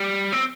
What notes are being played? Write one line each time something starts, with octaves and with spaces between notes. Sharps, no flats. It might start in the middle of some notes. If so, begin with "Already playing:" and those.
Already playing: G3
C4